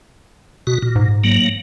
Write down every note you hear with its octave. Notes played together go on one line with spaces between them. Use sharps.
B2 F#4
A#2
G#2
F#3 A#3